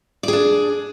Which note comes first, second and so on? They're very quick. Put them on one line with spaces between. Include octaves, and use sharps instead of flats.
D5 G#4 D4